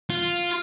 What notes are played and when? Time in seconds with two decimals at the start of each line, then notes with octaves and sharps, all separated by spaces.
0.10 F4